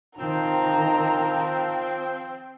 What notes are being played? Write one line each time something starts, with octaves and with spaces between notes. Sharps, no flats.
D#3 F3 C4 A#5